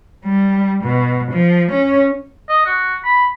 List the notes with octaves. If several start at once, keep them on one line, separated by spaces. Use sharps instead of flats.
G3
B2
F3
C#4
D#5
F#4
B5